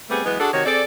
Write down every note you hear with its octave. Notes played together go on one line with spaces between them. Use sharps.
G3 A3 B3 C4 G#4
E3 F#3 G#3 B3
D4 F#4 G#4 A4
C3 D#3 F#4 C#5
C4 G#4 A4 D5